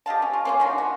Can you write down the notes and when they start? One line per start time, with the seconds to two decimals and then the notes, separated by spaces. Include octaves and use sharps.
0.06 G4 D#5 F5 A5
0.22 C#4
0.33 F4
0.45 A#3 C#4 F4
0.60 D#3 F3 F#4
0.78 F#4